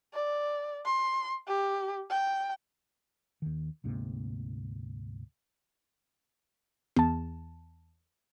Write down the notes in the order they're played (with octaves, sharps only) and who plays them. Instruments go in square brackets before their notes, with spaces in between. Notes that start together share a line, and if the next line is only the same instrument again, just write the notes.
[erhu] D5
C6
G4
G5
[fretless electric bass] D#2 D#3
D2 G#2 C3 A#3
[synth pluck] E2 A5